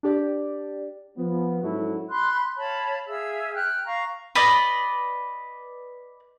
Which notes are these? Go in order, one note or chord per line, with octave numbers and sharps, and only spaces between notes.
D4 G4 D5
F3 B3
G#2 F#3 C#4 E4 F#4 A4
B5 C6 F#6
C#5 F5 A5 B5
G#4 E5 F5 E6
G5 F6 F#6
F5 A#5 C#6
B4 D5 D#5